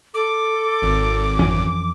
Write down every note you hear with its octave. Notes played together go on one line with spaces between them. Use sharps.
A4 D6
G#1
F2 E3 C#4